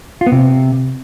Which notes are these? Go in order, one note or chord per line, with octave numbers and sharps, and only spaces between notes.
F4
B3
C3